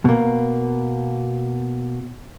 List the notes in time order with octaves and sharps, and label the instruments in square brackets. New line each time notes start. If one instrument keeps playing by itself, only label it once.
[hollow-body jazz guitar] B2 A#3